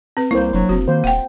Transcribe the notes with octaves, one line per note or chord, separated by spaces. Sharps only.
C4 B4
C2 A#3 E4 C5
F1 F#3 D4
F1 C4 F#4
D#3 A#3 C5
D#1 F#5 G5